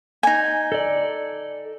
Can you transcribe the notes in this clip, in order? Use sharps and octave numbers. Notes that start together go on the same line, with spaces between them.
D#4 G#5
A4 D5